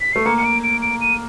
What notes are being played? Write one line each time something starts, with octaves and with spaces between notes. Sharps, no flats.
B6
A3 C7
A#3 C#7
C#7
D7
D7
D7
D#7